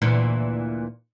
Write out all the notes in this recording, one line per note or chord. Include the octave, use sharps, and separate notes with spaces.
D2 A#2 E3